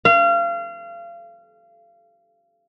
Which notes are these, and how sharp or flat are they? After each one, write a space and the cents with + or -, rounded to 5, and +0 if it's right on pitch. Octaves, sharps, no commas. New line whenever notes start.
F5 -30